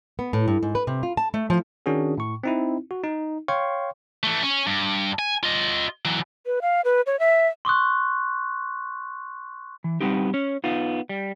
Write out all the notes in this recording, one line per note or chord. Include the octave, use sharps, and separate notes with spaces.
B3
A2
G2
G#2
B4
C3
F4
A5
A3
F3
D#3 C#4 D4 F#4 G#4
A2 C#6
C4 D#4 E4
F#4
D#4
C#5 F5 G5 C6 C#6
E3 A3
C#4
G2
G#5
F4 D#5
E3 F#3
B4
F5
B4
C#5
E5
C6 C#6 D#6 F#6
E3
G3 B3 C4 D#4 G4
C#4 C#5
B3 D#4 F4
G3